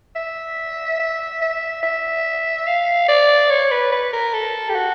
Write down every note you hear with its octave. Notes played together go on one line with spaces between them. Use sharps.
E5
E5
E5
E5
F5
D5
C#5
B4
B4
A#4
A4
G4
F#4